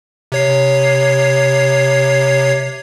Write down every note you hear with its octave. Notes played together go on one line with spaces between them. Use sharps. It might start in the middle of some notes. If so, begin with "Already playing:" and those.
C3 C#5 C7